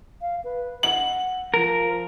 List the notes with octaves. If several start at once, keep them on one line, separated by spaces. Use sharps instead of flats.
F5
B4
F#5 F#7
F3 A#4